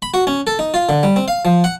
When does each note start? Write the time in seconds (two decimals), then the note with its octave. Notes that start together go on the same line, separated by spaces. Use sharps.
0.02 B5
0.14 F#4
0.27 C#4
0.47 A4
0.59 D#4
0.74 F4
0.89 D3
1.03 G3
1.16 C4
1.28 F5
1.45 F3
1.64 F#5